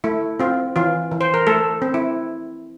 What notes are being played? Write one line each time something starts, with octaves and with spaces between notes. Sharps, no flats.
A3 E4
C4 F4
E3 F4
E3
C5
A#4
A3 A4
C4
E4